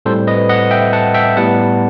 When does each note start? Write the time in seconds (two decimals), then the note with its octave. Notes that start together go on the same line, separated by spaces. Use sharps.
0.06 A2 G3 C4 A4 C5
0.27 B4 D#5
0.49 D#5 F#5
0.71 E5 G5
0.93 F#5 A5
1.14 E5 G5
1.36 A2 G3 B3 F#5 A5